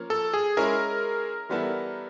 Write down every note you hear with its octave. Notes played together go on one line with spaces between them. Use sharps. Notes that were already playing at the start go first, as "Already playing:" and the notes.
Already playing: F3 A#3 C#4 A#4
A4
G#4
G#3 C#4 E4 G#4 A#4
E3 G3 B3 E4 A4